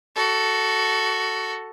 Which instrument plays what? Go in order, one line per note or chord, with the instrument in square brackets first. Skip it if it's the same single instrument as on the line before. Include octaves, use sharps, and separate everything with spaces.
[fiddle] F#4 A4